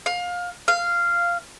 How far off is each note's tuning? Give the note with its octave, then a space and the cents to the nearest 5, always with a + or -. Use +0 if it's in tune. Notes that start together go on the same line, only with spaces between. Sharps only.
F5 +25
F5 -10